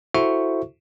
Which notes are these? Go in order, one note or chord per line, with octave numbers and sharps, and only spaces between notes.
E4 F#4 A4 C5 E5 C#6